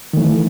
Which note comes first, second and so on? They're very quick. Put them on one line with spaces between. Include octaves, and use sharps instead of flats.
D#3 A3 E3